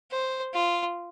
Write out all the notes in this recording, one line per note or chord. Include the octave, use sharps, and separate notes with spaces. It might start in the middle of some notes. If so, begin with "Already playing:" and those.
C5
F4